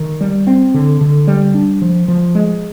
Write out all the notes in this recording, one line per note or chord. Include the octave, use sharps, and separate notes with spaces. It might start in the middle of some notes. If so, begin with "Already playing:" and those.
Already playing: D#3
G3
C4
D3
D3
G3
D4
F3
F3
G#3